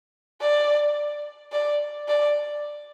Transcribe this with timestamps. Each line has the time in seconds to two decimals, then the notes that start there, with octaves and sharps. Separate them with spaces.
0.41 D5
1.52 D5
2.08 D5